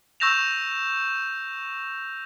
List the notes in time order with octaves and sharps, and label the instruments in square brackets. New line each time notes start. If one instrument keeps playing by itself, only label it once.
[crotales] C#6 E6 G6 A#6 E7 F7